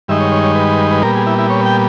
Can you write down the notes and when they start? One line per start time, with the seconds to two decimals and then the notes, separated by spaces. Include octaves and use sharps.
0.08 G2 D#3 G#3 D#4 E5
0.20 C#5
0.32 C#5
0.43 C#5
0.55 B4
0.91 B4
1.03 A#2 G3 B3 A#4
1.15 G#4
1.27 E4
1.39 E4
1.50 C#5
1.66 G5